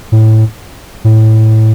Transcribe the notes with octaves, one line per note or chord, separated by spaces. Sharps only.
A2
A2